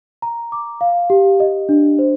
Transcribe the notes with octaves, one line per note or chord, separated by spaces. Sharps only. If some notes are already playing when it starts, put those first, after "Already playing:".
A#5
D6
F5
G4
D#5
D4
C5